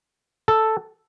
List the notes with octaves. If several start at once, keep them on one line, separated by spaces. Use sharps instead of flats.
A4